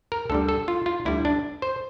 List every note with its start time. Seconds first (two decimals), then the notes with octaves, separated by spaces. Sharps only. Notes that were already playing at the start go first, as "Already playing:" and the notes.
0.12 A#4
0.30 D2 D3 G3 A4
0.49 A4
0.68 F4
0.86 F4
1.05 D2 D3 G3 E4
1.25 D4
1.62 C5